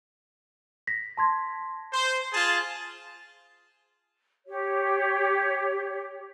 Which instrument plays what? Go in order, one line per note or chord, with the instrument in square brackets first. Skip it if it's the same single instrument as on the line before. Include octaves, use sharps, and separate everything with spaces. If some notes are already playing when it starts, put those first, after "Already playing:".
[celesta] A#6 B6
A5 C6 G#6
[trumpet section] C5
F4 G#4 A5
[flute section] G4 C#5